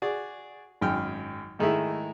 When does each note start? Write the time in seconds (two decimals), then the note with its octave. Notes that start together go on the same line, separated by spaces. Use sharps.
0.02 F#4 G#4 D5
0.81 G#1 F#2 G5 F6
1.59 G#2 D#3 G#3 A3 E4